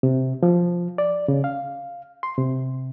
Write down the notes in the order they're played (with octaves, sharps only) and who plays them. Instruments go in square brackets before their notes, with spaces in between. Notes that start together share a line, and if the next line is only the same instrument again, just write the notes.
[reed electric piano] C3
F3
D5
C#3
F5
C6
C3